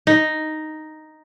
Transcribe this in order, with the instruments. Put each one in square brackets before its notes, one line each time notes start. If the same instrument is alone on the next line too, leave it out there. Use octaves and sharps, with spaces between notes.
[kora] D#4